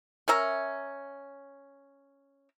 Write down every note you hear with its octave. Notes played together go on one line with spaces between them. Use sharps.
C#4 A#4 E5 A#5